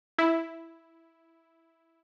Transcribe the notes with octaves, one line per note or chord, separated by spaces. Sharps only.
E4